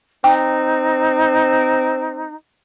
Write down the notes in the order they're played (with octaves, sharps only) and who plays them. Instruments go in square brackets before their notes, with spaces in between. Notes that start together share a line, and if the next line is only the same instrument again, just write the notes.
[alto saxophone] C4 [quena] D#4 [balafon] G5